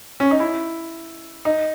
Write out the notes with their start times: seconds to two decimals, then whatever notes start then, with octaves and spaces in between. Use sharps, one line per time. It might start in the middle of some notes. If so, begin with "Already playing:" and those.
0.20 C#4
0.31 D#4
0.40 E4
1.45 D#4